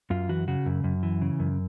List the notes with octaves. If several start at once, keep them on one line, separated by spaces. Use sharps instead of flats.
F#2 F4
E3 F#4
C#3 F#4
F#2
F#2
E3
C#3
F#2